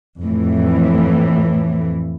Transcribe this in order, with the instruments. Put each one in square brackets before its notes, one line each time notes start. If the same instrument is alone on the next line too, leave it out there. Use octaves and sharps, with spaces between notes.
[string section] F2 A2 E3